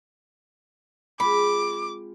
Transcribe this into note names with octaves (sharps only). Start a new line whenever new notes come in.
G#3 C4 F4 B5 D6